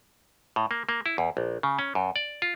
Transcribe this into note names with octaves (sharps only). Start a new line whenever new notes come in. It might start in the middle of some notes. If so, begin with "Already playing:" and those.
A2
A#3
A#3
E4
E2
A#1
C#3
C#4
F#2
D5
F4